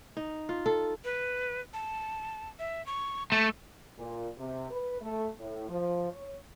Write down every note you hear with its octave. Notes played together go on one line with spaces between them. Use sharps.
D#4
F4
A4
B4
A5
E5
C#6
A3 A5
A#2
C3
B4
A3
A2
F3
C#5